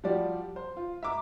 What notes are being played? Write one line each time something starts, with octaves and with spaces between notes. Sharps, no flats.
F3 G3 F#4 G4 D5
C5
F4
E5 A#5 D6